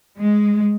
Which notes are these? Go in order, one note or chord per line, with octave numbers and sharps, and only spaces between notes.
G#3